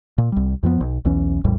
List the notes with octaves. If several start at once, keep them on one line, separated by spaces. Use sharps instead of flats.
A#2
C2 G3
F2 F3 B3
B1
B1 E2 E3 C#4
A#1 E2 A2 G3